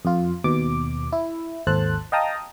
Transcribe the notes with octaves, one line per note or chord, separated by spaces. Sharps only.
F2 F4
D#2 B2 D6
E4
G#1 D#2 A4 C5 A5 F#6
D#5 F5 G5 A5 A#5 D#6